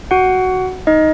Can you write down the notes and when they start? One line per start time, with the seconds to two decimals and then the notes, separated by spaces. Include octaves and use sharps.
0.11 F#4 F#5
0.87 D#4 D#5